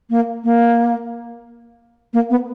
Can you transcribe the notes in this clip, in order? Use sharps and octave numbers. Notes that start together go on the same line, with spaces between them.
A#3
A#3
A#3
B3